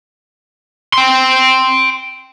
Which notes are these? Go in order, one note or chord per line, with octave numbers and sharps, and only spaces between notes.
G5 C6